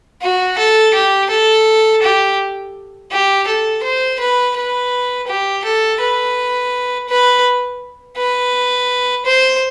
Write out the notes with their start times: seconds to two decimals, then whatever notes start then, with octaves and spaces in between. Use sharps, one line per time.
0.22 F#4
0.58 A4
0.94 G4
1.30 A4
2.03 G4
3.11 G4
3.47 A4
3.84 C5
4.20 B4
4.56 B4
5.28 G4
5.64 A4
6.00 B4
7.09 B4
8.17 B4
9.26 C5